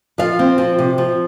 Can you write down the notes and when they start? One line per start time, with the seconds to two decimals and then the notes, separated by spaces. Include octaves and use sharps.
0.18 F3 F4 F5
0.39 C4
0.58 F3
0.79 C3
0.98 F3